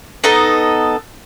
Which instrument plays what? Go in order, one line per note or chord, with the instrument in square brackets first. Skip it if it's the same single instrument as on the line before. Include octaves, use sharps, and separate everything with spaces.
[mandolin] B3 D#4 A4 D#5